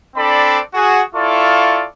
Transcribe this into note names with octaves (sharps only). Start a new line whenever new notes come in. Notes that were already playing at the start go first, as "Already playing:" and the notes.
C4 D4 A4 D5 B5
F#4 G#4
E4 F4 A4 D5 F5 C#6